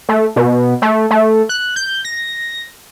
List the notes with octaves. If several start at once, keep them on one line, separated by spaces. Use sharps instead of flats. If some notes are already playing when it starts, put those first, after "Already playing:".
A3
B2
A3
A3
F#6
G6
A#6